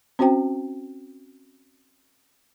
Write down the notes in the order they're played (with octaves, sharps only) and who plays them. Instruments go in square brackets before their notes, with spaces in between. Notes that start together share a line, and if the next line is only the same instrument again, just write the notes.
[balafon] C4 C#4 F#4 C5 G5